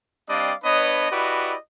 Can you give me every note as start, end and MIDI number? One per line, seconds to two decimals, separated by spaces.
0.29 0.53 55
0.29 0.53 60
0.29 0.53 62
0.29 0.53 74
0.29 0.53 75
0.29 0.53 77
0.64 1.07 59
0.64 1.07 62
0.64 1.07 71
0.64 1.07 73
0.64 1.07 75
1.12 1.56 64
1.12 1.56 66
1.12 1.56 67
1.12 1.56 71
1.12 1.56 74
1.12 1.56 75